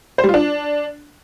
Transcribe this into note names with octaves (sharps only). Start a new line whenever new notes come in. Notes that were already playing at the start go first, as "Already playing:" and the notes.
C5
G3
F4
D4